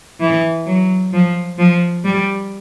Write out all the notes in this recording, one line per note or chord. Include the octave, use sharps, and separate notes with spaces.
E3
F#3
F3
F3
G3